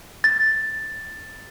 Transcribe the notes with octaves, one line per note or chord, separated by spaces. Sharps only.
A6